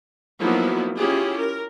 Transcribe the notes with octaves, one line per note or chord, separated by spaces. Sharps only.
F3 F#3 A#3 B3 D#4 E4
C#4 E4 F4 G4 G#4
A#4